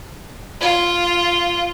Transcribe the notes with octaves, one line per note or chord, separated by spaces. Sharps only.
F4